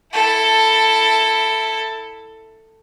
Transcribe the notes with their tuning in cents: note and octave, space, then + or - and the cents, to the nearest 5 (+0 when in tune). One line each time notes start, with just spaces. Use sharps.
E4 +0 A4 +10